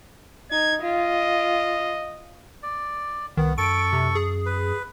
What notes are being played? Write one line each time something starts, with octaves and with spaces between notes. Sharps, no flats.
D#4 G#6
F4 D#5
D5
C2 D#3 B3
F#2 A4 C#6 D7
C3
G#4
B4